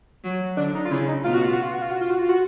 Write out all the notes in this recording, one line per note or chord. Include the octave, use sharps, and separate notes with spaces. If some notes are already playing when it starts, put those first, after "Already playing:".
F#3
D3 D4
D#4
F4
C#3 E4
D#4
B2 F4
F#4
F4
F#4
F4
F#4
F4
F#4
F4
F#4
F4
F#4